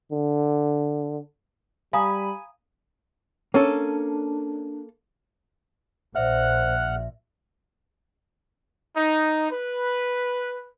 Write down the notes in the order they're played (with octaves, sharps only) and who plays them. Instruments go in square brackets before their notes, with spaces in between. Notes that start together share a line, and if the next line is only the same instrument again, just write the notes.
[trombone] D3
[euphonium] G3 [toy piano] F5 A#5 D#6 [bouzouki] G#5 [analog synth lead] B5
[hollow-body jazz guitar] A#3 A4 [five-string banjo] C#4 [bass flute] D4
[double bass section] A#1 A#2 [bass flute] C5 [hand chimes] D5 E5 [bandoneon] F#5 F6 F#6
[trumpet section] D#4
B4